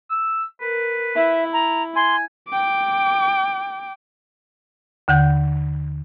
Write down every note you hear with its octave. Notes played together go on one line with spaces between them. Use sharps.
E6
A#4 B4
E4 E5
A#5
G#5 C6
G5 D6
D#2 D3 F#5 G6